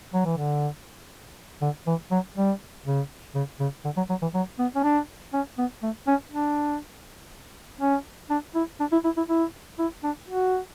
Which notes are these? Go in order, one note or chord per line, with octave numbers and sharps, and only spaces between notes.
F#3
E3
D3
D3
E3
F#3
G3
C#3
C#3
C#3
D3
F#3
F#3
E3
F#3
B3
C#4
D4
C#4
B3
A3
C#4
D4
C#4
D4
E4
D4
E4
E4
E4
E4
E4
D4
F#4